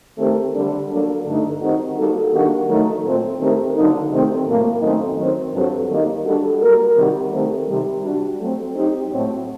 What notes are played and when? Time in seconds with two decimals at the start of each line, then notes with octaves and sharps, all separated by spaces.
0.18 D#3 A3 C4 G4 A#4
0.54 D3 G3 D4
0.90 F#3 A#3 D4 A4
1.26 G2 D3 A3 D#4
1.61 D#3 G3 C4 D#4 F#4
1.97 G3 A#3 D#4 F#4 A4
2.33 D#3 G3 A#3 D4 F#4
2.68 D#3 F#3 A3 D#4
3.04 A#2 A3 C4
3.40 D#3 A3 C4 G4 A#4
3.75 D3 F#3 A#3 D#4
4.11 C3 D#3 A3 C4
4.47 A2 F#3 A#3
4.82 F#2 D#3 A3 C4 D#4
5.17 D#3 F#3 C4
5.53 G2 F#3 C4 F#4 A4
5.89 D#3 G3 A#3 D#4
6.25 G3 D4 F#4 A4
6.61 G3 A#3 F#4 A#4
6.96 C3 D#3 G3 C4 F#4
7.32 D#3 A3 C4 G4 A#4
7.67 C3 D#3 G3
8.03 G3 D4 F#4
8.39 F#3 A3 C4
8.75 F#3 C4 D#4 G4
9.10 A2 F#3 C4